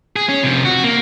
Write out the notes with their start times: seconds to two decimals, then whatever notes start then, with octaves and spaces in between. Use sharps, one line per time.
0.16 G#4
0.29 C#4
0.44 C3 F3
0.65 F#4
0.84 A#3